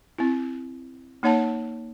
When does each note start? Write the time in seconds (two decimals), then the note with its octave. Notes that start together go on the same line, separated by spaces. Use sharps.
0.18 C4 E4
1.23 A#3 D#4 C#5 F#5 A5